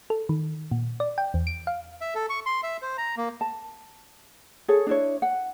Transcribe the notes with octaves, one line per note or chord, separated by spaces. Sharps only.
A4
D#3
A#2
D5
G5
E2
D7
F5
E5
A4
C#6
C6
E5
C5
A#5
A#3
A5
G#4 A4 C#5
D4 E4 C#5
F#5